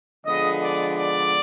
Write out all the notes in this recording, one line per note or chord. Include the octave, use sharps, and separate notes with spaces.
D3 F3 G#3 B3 D#5
D5
D5